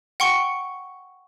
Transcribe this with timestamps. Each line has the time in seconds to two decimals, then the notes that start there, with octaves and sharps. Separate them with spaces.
0.20 F#5 G5 C6 C#6 C#7